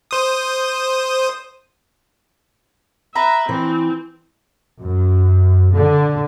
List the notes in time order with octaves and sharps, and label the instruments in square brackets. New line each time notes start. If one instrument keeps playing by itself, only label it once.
[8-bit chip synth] C5 D#6
[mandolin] B4 A#5 [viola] E5
[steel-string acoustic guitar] E3 [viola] C4
[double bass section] F#2
D3